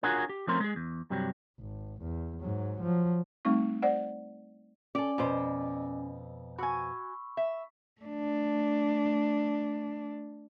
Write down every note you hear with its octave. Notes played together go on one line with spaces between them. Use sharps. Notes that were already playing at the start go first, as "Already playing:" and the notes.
D4 F4 F#4 G#4 A#4 C#5
G4
F3 A3 C4 C#4 A#4 C6
G#3 G#4
E2
G2 C3 F#3 G3
G#1
E2
G#2 F#3
F3 F#3
G3 A3 C4 D#4 C#6
C5 D5 F#5
C#4 G4 A4 D5 G#5
F2 B2 C5
F#4 G#5 B5 C#6 E6
E5
A3 D4